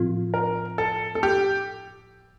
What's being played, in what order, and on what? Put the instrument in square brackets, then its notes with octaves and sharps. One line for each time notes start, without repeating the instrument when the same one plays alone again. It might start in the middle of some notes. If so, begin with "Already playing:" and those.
Already playing: [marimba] A2 F3 C4 F4
[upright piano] A#4
A4
A4
G4